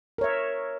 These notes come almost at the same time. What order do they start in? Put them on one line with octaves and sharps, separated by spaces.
A#4 C#5 E5